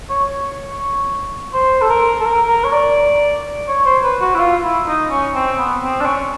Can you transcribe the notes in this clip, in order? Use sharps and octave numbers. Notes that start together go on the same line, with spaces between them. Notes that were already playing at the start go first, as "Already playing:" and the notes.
C#5
C5
A4
A#4
A4
A#4
A#4
C#5
D5
C#5
C5
B4
F#4
E4
F4
E4
D#4
C#4
C4
B3
C4
D4
C#4